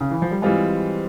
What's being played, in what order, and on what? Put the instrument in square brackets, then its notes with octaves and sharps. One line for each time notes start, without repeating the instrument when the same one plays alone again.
[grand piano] C#3
E3
F3
G3
[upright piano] E3 G3 C4 F4 [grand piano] G#3